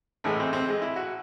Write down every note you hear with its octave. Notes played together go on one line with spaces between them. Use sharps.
A1 A2 E3 G#3 A3
C4
C4
G#3
E4
F#4